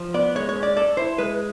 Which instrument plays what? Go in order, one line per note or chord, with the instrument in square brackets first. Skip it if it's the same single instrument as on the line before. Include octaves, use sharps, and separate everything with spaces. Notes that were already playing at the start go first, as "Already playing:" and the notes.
Already playing: [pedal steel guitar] F3
[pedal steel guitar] B3 [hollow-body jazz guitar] D5
[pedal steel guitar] G#3 [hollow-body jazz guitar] C#5
[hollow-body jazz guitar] C#5
[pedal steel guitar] C#4
[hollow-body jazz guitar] D5
[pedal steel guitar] A4 [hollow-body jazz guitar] D5
[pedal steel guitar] E4 [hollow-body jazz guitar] C5
[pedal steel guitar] G#3 [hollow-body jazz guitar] B4